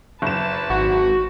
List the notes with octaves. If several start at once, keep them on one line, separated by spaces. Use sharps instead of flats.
F#1 B4 A5 E7
G#1 F#4